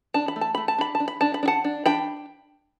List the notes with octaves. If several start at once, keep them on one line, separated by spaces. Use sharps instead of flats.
D4 A5
B5
A3
A5
A3 B5
A5
D4 B5
A5
D4
B5
D4 A5
B5
D4
F#5 A5
D4
D4 G5 B5